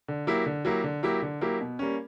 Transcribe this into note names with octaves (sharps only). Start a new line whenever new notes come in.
D3
F#3 A#3 E4 G4
D3
F#3 A#3 E4 G4
D3
F#3 A#3 E4 G4
D3
F#3 A#3 E4 G4
B2
G3 A#3 C#4